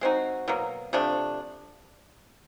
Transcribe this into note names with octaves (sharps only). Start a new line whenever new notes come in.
G#3 C4 D#4 F#4
B2 F#3 A#3
C3 F3 A3 D4